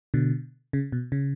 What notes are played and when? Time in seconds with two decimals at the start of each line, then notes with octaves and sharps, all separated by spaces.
0.14 B2 D3
0.73 C#3
0.92 B2
1.12 C#3